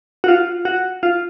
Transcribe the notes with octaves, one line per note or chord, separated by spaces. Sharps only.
F#4
F4
F#4
F4